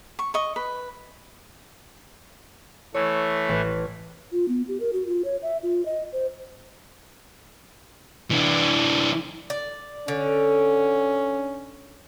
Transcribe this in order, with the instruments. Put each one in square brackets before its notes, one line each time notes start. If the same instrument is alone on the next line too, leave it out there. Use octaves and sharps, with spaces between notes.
[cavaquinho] C#6
D#5 C#6
B4
[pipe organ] E3 A3 [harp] C#5
[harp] A1 B4
[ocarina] F4
B3
G4
A#4
F#4
F4
C#5
E5
F4
D#5
C5
[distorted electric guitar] E3 D4
[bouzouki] D5
[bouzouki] D3 [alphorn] C#4